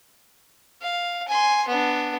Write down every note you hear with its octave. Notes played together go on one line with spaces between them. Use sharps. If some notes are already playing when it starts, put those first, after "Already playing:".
F5
G#5 C6
B3 D4